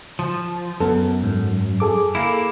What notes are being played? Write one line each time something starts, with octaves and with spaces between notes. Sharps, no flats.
F3
F#2 B3 A4
G#2
G#4 A4 D6
A#3 E4